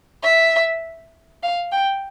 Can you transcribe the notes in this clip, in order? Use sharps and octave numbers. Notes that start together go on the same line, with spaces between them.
E5
F5
G5